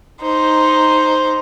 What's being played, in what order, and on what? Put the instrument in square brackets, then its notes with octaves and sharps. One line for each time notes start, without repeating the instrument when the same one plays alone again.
[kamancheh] D#4 C5